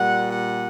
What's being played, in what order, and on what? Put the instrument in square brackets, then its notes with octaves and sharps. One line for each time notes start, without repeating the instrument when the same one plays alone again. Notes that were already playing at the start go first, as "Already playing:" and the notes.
Already playing: [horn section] A#2 G3 F#5
F#5